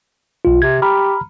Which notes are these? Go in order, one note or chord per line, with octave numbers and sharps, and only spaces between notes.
B1 F4
C3 G#6
G4 A#5 B5 F6